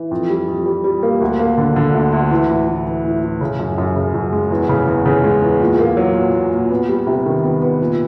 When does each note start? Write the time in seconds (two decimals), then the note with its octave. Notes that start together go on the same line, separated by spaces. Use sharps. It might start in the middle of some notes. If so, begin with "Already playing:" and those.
Already playing: E3
0.11 F2
0.30 G3
0.48 F2
0.66 G3
0.84 G3
1.03 A#3
1.21 D2
1.39 A#3
1.58 D3
1.76 D3
1.94 D2
2.13 D2
2.31 E3
2.49 A2
2.68 E3
2.86 E3
3.04 A2
3.23 A2
3.41 C#3
3.59 F#2
3.78 F#2
3.96 C#3
4.14 F#2
4.32 G#3
4.51 E2
4.69 C#3
4.87 E2
5.06 C#3
5.24 G#3
5.42 E2
5.60 A#2
5.79 A#3
5.97 F#3
6.16 A#2
6.34 A#2
6.52 A#2
6.70 B3
6.89 G3
7.07 C3
7.26 D#3
7.43 B3
7.62 B3
7.80 A#2